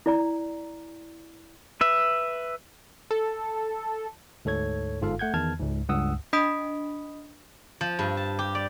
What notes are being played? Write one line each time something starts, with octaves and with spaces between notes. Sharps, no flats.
E4 D5 A#5
B4 E5
A4
D2 G#2 A4 C#5 G#6
G1 G#2 F4 A4 F5
A3 F#5 G6 G#6
E2 D#3 A5 F6 G#6
C#2 G#2
C#2 G2 F#5 D#6 E6
D4 D#5 B5 D#6 B6 D7
F3
G2
A5
G4
D5